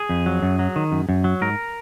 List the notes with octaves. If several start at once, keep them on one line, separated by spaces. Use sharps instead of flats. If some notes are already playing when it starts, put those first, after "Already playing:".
Already playing: G#4
F2
F#3
F#2
F#3
D#3
F#2
F#2
F#3
G#2 A#4